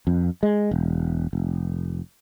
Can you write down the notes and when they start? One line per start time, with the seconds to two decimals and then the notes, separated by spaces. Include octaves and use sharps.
0.07 F2
0.43 G#3
0.71 E1
1.33 F1